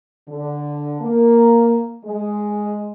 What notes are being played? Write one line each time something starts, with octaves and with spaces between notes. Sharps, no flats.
D3
A#3
G#3